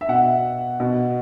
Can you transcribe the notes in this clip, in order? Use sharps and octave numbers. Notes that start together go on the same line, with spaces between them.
E5
B2 F#5
B2